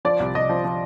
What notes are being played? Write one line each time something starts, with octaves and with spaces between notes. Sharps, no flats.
F3 D5
C2
C2 D#5
F3
F3